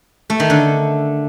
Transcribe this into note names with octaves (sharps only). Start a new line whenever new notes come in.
A3
D#3
D3